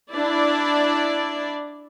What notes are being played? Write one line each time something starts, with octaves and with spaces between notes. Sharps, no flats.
D4 E4 D5